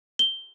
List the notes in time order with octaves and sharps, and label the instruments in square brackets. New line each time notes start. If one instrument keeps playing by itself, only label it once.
[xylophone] G7